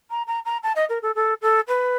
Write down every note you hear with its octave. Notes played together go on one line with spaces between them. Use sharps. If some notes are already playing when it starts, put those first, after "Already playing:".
A#5
A#5
A#5
A5
D#5
A#4
A4
A4
A4
B4